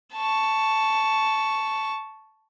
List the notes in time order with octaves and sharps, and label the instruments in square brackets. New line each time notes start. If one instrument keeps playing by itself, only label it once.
[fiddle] A5 C#6